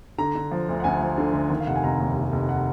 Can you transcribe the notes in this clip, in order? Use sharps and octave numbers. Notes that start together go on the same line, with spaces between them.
D3 A#5
D3
F3
D2
F#5
D2 G#5
F3
D3
D2
D#3
F5
F1 F#5
G#5
F1 A#5
D#2
F1
F1
F#5